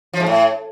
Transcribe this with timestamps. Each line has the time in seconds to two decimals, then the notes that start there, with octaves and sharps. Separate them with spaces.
0.13 F3
0.20 G#2
0.26 A2